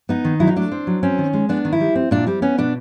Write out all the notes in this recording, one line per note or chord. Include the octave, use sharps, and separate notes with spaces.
B3 D#4
D#3
F#3 E4
D#4
A3 D4
C4
F#3
C4 C#4
D#3
G#3
B3 D4
D#3
E4
G3
C4
A#2 D4
G3 C4
B3 C#4
B2 D4